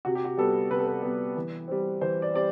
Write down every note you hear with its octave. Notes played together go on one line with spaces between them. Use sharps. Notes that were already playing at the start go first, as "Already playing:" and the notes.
C3 F#4
G4
F#4
G3 B3 A4
C3 B4
A4
B4
G3 B3
E3
G3 C4
E3 C5
D5
G3 C4 D5